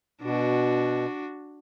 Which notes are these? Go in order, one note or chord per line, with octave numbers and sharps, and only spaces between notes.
B2 D4 F#4